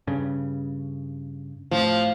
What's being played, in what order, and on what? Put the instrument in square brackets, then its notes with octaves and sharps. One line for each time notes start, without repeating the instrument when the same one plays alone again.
[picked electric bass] G2 C#3
[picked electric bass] A2 [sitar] F3